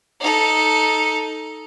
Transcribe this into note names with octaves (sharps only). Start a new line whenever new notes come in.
D#4 A4